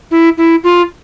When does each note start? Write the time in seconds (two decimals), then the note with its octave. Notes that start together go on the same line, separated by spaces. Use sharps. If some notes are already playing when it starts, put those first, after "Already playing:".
0.11 E4
0.38 E4
0.64 F4